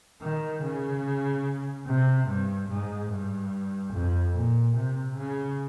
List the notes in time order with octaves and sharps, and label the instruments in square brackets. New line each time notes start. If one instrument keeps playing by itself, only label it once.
[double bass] D#3
C#3
C3
G2
G#2
G2
F2
A#2
C3
C#3